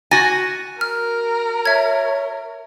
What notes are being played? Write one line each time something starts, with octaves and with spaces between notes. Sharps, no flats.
F#4 G#5 A6 A#6
A#4 F6
C#5 E5 G#6